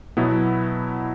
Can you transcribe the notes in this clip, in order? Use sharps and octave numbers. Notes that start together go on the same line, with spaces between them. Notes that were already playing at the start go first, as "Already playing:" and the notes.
B2 F#3 B3 E4